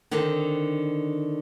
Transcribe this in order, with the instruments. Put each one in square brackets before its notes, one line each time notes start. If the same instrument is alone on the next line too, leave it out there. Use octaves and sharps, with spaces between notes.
[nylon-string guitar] D3 D#3 C4 D4